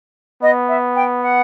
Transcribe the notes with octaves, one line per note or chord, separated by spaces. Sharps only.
B3 D#5
E5
G5
F#5